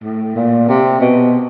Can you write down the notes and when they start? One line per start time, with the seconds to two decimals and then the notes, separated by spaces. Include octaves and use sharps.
0.03 A2
0.36 A#2
0.68 C3
1.01 B2